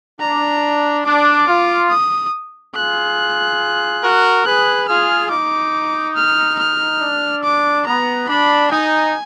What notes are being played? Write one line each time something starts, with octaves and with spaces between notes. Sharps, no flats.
D4 A#5
D4 D6
F4
D#6
F4 G#4 F#6
F#4 A#4
G#4 B4 F#6
F4 G#4 F6
D#4 D6
F6
F6
D4
D6
B3 A#5
D4 B5
D#4 G#5